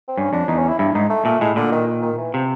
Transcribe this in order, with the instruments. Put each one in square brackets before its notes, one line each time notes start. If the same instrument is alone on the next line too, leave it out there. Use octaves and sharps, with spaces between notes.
[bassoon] C4
[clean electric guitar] G2 [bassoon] C#4
[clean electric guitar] F2 [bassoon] D4
[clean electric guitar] E2 [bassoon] D#4
[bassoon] C#4
E4
[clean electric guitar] G2 [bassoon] E4
[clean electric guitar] G#2 [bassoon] D#4
[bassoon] A3
[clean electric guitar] A#2 [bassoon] A3
[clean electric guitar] A2 [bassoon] G#3
[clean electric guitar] A#2 [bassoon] D3
[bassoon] D#3
D#3
D#3
E3
[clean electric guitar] C3 [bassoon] F3